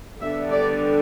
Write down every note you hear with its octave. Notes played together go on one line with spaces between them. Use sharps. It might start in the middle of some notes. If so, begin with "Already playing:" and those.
D3 G3 B3 D4 E5
D5